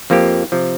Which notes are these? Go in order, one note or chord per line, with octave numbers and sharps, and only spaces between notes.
F2 F3 A#3 G4
C3 F3